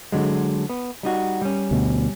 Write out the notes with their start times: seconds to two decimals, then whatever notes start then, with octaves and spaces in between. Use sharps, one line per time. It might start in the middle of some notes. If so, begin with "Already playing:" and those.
0.12 D3 F#3 G#3
0.69 B3
1.03 G3 D#4 F#4
1.42 G3 C#4
1.71 D2 B2